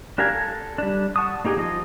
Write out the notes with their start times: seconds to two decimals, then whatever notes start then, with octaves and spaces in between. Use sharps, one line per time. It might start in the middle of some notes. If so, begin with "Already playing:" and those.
0.18 D4 G4 A#4 F5 G#5
0.33 A4
0.78 G3 D4
1.16 F#5 A5 C#6 D#6
1.45 A#3 D#4 G4 G#4
1.57 F3 D#5